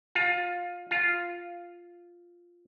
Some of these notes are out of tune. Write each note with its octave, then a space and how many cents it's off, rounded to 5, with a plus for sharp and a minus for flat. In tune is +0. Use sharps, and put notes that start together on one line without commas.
F4 +20
F4 +0